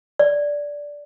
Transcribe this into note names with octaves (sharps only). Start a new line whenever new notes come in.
D5